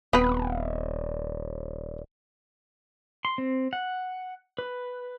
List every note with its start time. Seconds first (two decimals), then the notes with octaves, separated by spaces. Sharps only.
0.13 D#1 B3 C4 B4
3.25 C6
3.38 C4
3.73 F#5
4.58 B4